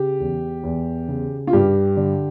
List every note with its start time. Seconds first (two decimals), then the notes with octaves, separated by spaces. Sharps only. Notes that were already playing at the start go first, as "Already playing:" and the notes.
Already playing: C#3 G4
0.20 E2
0.63 E2
1.08 C#3
1.47 F4
1.53 G2 G4
1.97 D3